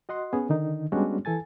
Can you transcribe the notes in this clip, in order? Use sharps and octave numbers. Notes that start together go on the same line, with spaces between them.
F#4 D#5 F#5 C6
B3 C#4 G#4
D3 D#3 D#4
G3 G#3 B3 C#4 D4 F#4
E3 A4 G#5 A6